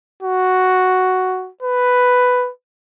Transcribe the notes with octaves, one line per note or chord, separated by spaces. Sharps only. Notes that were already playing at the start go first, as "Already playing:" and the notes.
F#4
B4